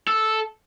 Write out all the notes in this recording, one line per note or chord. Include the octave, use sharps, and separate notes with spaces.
A4